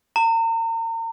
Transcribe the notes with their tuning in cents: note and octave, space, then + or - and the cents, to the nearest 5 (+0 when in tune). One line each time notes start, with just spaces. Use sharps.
A#5 -40